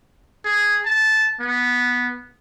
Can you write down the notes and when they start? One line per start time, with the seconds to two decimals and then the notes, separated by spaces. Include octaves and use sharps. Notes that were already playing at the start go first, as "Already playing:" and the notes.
0.45 G#4
0.85 A5
1.40 B3